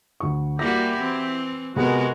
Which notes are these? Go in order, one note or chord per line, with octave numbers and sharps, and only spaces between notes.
D2 C#6
G3 A#3 E4 F#4 G4 A#6
E3 C4
C3 G#3 B3 F#4 G#4 A#4